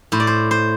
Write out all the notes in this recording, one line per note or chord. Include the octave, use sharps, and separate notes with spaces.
A2 C5
D5
C5
C5